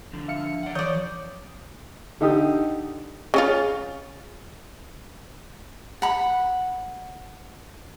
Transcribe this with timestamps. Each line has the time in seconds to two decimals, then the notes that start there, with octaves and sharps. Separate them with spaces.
0.13 D3 F3
0.28 E5 F5 C#7
0.63 D5 F#5
0.75 E3 F3 C#5 D5 C#6 D#6 G6
2.21 D3 D#4 G4 D#6
3.34 C#3 C#4 F4
6.02 F#5 B5